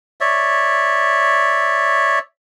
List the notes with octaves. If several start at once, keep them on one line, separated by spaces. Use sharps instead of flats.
C#5 D5 E5